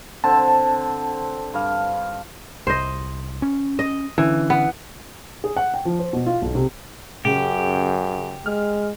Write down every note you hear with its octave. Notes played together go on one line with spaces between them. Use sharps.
D3 C4 A5
G2 F5
C2 C5 D#5
C#4
D#5
D3 E3 C#4 D4
B3
G#4
F#5
G5
F3
C5
B2
F4
B1
C3
F#2 C#3 G4
G#3 F6